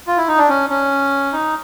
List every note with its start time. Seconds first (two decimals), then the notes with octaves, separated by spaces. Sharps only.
0.07 F4
0.17 E4
0.28 D#4
0.38 D4
0.49 C#4
0.70 C#4
1.33 D#4